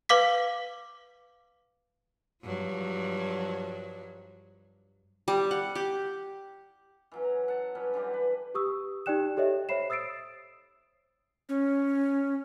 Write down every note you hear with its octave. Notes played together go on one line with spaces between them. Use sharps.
B4 F5 D6 B6
G2 F3 F#3
G3
F#5
G4
E3 F#3 C#4
A#5
F#5 A5
F#3 G3 C#4 B4
D3 E3 G3 G4
B4
G4 C#6 D#6 E6
D#4 G4 D5 G5 F#6 E7
G4 A4 C#5 D#5 E5
C5 C#5 E5 B5 C7 E7
D#6 E6 A6 C7 D7
C#4